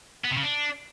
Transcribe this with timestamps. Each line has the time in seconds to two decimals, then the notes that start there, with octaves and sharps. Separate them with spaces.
0.25 B3
0.31 C3
0.37 C#3
0.43 D4